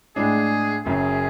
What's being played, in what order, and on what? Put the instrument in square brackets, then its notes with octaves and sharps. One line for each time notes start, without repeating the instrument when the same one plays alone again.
[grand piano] A2 G#3 D4 [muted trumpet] G#4
[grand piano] F#1 F#2 C#3 [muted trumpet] G#4